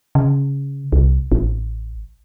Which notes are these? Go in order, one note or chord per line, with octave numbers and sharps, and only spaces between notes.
C#3
C2
A1